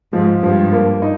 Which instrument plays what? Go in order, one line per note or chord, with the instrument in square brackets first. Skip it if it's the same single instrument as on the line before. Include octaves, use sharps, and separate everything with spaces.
[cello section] G#2 [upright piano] F3
[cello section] G2 [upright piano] F3
[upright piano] A#3
D#4